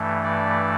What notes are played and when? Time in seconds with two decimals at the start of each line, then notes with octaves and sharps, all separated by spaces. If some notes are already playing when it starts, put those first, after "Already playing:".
Already playing: G2 E3 A3
0.24 D5